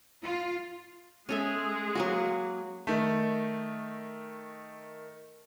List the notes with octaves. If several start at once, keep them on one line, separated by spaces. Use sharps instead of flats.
F4
G#3 C#4 G#4 A4 E5
F#3 A#3 F#4
D#3 A3